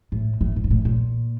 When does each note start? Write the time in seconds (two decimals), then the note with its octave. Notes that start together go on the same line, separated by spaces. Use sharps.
0.12 A2
0.41 A2
0.56 A#2
0.64 G#2
0.71 A2
0.85 A#2